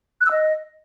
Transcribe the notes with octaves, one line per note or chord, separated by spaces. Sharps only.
F#6
E6
D#5